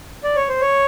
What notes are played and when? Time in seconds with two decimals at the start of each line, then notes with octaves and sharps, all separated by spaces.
0.24 D5
0.36 C#5
0.49 C5
0.61 C#5